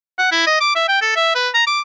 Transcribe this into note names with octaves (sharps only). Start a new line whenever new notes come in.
F#5
E4
D#5
D6
E5
G5
A4
E5
B4
A#5
D6